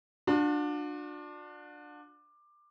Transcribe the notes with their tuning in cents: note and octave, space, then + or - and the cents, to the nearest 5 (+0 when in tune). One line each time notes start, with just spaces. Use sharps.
D4 +15 F#4 -45